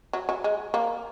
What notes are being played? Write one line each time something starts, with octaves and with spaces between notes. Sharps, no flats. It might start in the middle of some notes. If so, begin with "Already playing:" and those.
F#3
F#3
G#3
A#3